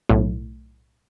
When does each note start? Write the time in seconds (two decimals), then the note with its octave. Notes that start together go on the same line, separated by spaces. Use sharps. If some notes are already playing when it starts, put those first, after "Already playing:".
0.09 B1 A2